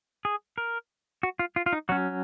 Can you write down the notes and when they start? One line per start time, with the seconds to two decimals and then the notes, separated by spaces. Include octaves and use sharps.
0.25 G#4
0.58 A#4
1.23 F#4
1.39 F4
1.56 F4
1.66 F4
1.73 D#4
1.89 F#3 C#4 F#4